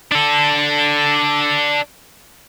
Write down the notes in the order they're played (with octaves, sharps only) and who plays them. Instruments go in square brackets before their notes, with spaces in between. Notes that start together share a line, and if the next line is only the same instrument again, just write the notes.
[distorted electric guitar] D4 A4